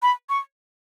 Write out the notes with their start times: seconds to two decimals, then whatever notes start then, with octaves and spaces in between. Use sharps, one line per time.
0.02 B5
0.29 C#6